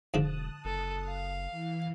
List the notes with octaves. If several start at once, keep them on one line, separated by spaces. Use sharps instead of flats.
E1 G#2 D3 F3 A5 D#6 F#6
F#1 A4
F5
E3